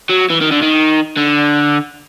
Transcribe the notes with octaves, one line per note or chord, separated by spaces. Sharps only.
F#3
E3
D#3
D3
D#3
D3